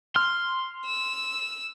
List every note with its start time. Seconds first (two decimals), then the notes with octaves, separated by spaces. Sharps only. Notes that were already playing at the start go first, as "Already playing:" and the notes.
0.16 C6 F6
0.85 E6